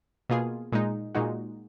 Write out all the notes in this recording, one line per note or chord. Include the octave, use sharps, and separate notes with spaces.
B2 A#3 F4 G#4
A#2 G#3 D#4
A#2 G#3 D#4 F#4